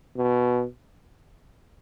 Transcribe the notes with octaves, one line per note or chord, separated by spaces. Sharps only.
B2